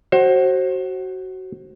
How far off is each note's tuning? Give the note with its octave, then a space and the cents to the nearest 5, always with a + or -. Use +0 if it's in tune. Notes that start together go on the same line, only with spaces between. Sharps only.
F#4 +20 C5 +30